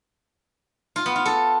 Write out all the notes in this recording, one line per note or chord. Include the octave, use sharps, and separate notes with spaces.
F4
B3
F4
A4